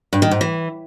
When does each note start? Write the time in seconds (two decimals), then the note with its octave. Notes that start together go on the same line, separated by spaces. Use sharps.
0.13 G2
0.22 D#3
0.31 G#2
0.41 E3